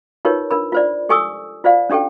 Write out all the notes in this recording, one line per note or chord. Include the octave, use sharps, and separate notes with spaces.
D#4 F4 G4 A#4 B4 C#5
D4 A#4 B5
F4 C5 D5
G4 A4 G#5 C#6 D#6 E6
F4 C5 D5 F5
C#4 D4 G4 A4 G5